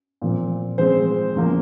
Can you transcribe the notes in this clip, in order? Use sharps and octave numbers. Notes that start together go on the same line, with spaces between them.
A#2 F3 C4
G#2 F3 G#3 C4 C5
E2 C#3 F3 A#3